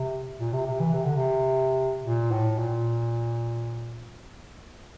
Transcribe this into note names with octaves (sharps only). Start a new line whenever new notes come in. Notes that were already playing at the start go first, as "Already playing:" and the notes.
Already playing: C3
A#2
C3
C3
E3
C3
D3
C3
A#2
A2
A#2